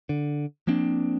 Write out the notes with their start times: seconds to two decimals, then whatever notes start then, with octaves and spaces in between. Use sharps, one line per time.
0.09 D3
0.67 F3 A#3 C4 D4